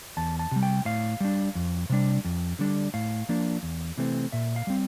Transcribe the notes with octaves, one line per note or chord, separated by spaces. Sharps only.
E2 A5
A5
C3 G3
G5
A2 F5
G3 D4
F2
C3 G3 D4
F2
D3 G3 D4
A2 F5
F3 A#3 D4
E2
C3 E3 A3 C4
A#2 E5
F5
G3 C4